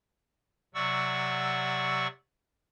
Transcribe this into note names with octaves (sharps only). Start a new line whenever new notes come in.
C3 F#3 D5 F#5 C#6 E6